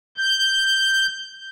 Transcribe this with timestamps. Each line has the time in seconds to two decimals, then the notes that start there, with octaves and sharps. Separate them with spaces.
0.18 G6